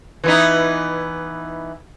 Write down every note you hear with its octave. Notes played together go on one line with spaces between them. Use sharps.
E3 B3 D#4